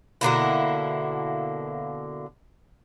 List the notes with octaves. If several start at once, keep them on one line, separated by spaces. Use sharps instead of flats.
B2 D3 A#3 E4